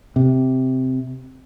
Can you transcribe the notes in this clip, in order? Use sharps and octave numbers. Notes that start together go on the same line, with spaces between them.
C3